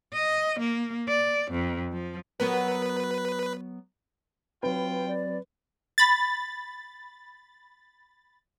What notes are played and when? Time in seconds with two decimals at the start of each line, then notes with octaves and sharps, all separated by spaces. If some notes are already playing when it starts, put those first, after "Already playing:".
0.13 D#5
0.59 A#3
1.09 D5
1.51 F2
1.92 F3
2.40 F#3 B3 A#4 B4
4.63 F#3 C4 F4 B4 G5
5.07 D5
5.98 B5 A6